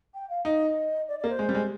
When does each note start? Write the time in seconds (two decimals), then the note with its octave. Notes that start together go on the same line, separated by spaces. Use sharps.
0.14 G5
0.29 F5
0.45 D#4 D#5
1.08 D5
1.19 D5
1.24 A#3
1.29 C5
1.39 G#3
1.49 G3
1.55 G#3